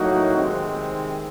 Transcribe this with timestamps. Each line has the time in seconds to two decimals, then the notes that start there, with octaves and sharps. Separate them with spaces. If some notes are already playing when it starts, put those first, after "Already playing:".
Already playing: A2 F#3 A#3 D#4 F#4
0.36 C3 D#3 G#3 C4